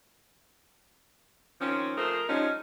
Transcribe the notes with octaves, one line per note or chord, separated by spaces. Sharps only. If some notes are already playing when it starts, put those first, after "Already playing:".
D#3 F3 C4 C#4
F3 A3 G#4 A#4 C5
F3 G3 G#3 C#4 D#4